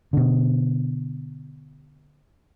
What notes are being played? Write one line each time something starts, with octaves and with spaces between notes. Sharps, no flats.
B2 D3